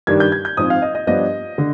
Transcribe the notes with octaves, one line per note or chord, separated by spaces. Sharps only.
G2 D#3 G3 D4 G#6
G6
G#6
G6
G#2 F3 C4 D#6
F5
D#5
D#5
G2 F3 B3 D4 D#5
D3